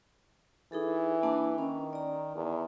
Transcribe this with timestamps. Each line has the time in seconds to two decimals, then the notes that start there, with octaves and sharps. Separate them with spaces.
0.72 E3 D#4 G#4 A4
1.23 A#3 D4 A5
1.58 D#3 C#4
1.93 D5 A#5
2.35 E2